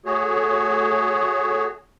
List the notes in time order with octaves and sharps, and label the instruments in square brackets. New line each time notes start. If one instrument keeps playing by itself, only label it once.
[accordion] A3 F#4 G#4 C#5